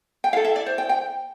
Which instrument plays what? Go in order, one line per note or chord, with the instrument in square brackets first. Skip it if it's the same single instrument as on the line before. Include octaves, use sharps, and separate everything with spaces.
[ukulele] G5
E4 A4 F5
E5
D5
C5
G5
G5